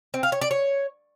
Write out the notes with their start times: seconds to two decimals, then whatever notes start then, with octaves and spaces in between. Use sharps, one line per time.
0.14 C4
0.23 F5
0.32 C#5
0.41 D5
0.51 C#5